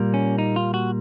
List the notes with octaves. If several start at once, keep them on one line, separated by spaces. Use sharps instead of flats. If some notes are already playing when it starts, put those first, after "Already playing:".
Already playing: A#2 G3 A#3
C#4
D#4
F4
F#4